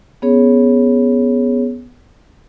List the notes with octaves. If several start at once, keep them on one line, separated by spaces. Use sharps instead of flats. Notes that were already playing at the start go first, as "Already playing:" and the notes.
B3 C#4 G#4 C#5